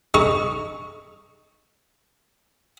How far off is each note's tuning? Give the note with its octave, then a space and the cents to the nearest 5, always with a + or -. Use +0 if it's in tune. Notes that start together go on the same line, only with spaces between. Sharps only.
D#4 -10 A4 -45 C#6 +0